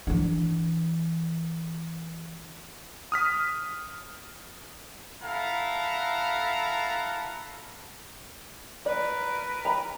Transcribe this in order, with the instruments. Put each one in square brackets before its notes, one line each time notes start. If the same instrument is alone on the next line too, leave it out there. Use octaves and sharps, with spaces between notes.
[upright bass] E3 D4
[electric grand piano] D#6 F6 B6
[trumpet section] E4 A4 F5 F#5 A#5
[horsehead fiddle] A#4 B4 [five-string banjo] D5
[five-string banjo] A#5 B5